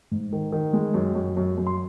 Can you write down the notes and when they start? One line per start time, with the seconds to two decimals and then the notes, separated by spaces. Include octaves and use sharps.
0.11 G#2
0.33 D#3
0.52 D#3
0.73 G#3
0.94 F#2
1.15 F#2
1.37 F#2
1.58 F#2
1.67 C6